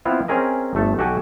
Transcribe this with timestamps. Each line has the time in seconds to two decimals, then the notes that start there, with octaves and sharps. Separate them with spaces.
0.05 B3 C4 E4 F4
0.28 C4 C#4 G#4 A#4 D#5
0.75 G1 A3 A4
0.98 B1 F#4 G4 A4 G#5 A5